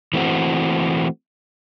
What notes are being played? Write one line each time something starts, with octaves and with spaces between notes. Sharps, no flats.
E3 A3 C4 F#4